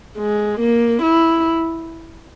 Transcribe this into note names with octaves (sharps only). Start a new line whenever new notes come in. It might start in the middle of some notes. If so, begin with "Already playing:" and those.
G#3
A#3
E4